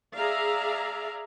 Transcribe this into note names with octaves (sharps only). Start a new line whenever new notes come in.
G#4 D5 E5 F5 A#5